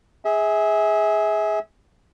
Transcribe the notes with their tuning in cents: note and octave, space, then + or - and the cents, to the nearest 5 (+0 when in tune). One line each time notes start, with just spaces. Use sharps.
G#4 +0 E5 -30